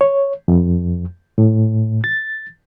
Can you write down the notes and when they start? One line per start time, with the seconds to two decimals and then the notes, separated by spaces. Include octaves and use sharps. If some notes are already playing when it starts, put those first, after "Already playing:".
0.01 C#5
0.48 F2
1.38 A2
2.04 A6